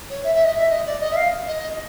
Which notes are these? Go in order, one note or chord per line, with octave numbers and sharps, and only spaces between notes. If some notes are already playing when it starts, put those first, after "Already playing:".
C#5
E5
E5
D#5
E5
D#5
D5
D#5
E5
F5
D#5